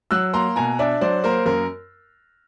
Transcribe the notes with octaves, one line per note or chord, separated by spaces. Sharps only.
F#3 E6 F#6
A#3 A#5 C6
B2 G#5 A#5
D4 D5 E5
F#3 C5 D5
A#3 A#4 C5
F#2 A#4